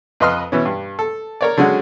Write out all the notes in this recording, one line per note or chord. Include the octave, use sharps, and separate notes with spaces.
F2 B4 D#5 C6 F6
B2 E3 C#4
G2
A4
A#4 C#5 D5
D3 F#3 G#3 C#4 F#4